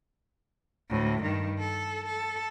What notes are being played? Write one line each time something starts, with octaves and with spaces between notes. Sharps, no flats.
D2 A2
G2 D#3
A4
A4